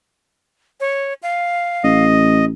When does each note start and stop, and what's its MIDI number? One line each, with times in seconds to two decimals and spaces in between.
0.80 1.14 73
1.23 2.05 77
1.84 2.53 33
1.84 2.45 75